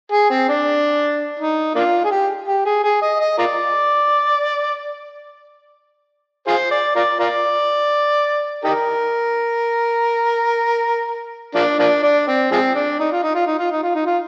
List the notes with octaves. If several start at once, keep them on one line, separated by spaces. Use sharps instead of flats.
G#4
C4
D4
D#4
A#3 D4 F4
G#4
G4
G4
G#4
G#4
D#5
D#5
F4 A#4 D5
F4 G#4 C5
D5
F4 A#4 D5
F4 A#4 D5
D#4 G4 A#4
F3 A#3 D4
F3 A#3 D4
D4
C4
F3 G#3 C4
D4
D#4
F4
D#4
F4
D#4
F4
D#4
F4
D#4
F4